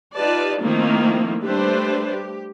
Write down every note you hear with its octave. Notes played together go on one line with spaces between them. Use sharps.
D#4 F4 G4 B4 D5 A5
D#3 F3 A3 A#3 C4 E4
G3 A3 D4 G4 B4 C5
G4